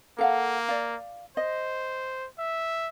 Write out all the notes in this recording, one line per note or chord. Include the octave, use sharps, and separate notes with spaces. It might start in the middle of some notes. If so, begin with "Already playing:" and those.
A#3 A4 F5 F#5
D5 F5
C5 D#5
E5